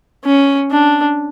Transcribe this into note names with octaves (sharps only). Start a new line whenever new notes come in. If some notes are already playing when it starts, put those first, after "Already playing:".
C#4
D4